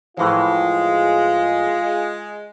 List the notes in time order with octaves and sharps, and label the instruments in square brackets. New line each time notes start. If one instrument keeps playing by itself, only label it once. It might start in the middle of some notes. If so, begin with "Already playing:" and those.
[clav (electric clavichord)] A2 E3 F3 [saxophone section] G#3 [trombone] F4